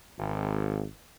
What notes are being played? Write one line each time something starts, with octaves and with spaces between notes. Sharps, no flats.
G#1